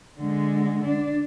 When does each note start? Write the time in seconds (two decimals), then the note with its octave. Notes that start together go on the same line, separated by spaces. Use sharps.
0.19 D3 G#3
0.84 D4